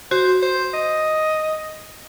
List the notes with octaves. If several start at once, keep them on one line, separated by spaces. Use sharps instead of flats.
F#4 C5
C5
D#5